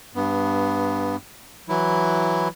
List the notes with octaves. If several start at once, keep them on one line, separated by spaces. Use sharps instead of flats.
G2 B3
E3 F#3 E4